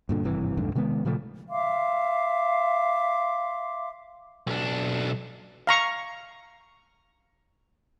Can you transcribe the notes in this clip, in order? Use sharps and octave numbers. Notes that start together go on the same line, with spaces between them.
G2 A#2 D3
G#1 G2 C3 E3
B1 F2 G#2 D3
C3 D#3 G#3 B3
A#2 C#3 F3 A3
E5 F5 C6 D6
B1 D4
F5 A#5 C#6